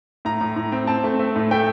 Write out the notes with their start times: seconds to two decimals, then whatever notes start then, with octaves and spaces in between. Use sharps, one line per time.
0.25 A2 A#5
0.41 A2
0.56 A2
0.72 C4
0.87 C4 A5
1.04 A3
1.19 A3
1.36 A2
1.51 A3 G5